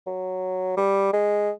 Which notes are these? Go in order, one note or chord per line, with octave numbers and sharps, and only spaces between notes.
F#3
G3
G#3